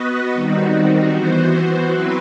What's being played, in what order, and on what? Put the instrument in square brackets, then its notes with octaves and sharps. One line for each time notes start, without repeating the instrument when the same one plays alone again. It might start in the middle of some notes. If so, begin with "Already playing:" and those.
Already playing: [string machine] B3 F#4 B4 D#5
D#3 G3 C4 D#4 F#4
E3 B3 F#4 C5
F#3 C4 E4 B4